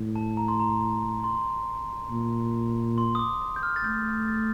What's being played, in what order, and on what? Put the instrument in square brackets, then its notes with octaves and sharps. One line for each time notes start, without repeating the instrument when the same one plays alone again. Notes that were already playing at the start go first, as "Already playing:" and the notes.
Already playing: [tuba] A2
[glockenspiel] A5
A#5
C6
A#5
C6
[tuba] A#2
[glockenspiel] C6
D#6
D6
G6
F6
A6
[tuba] A3 [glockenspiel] G6
[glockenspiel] A6